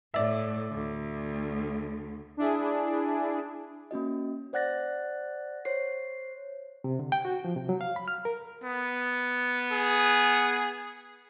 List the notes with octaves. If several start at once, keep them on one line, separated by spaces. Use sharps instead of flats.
A2 D5 E5
D2
D4 E4 G#4
A#3 C#4 F#4 D#5
C5 D5 F#5 F#6 A6 A#6
C5 C#5 C7
C3
D3
G5
F#4
F3
C3
F#3
F5
B5
F6
A#4
B3
G#4